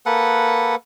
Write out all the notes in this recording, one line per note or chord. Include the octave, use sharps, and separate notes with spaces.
A#3 A4 B4 F#5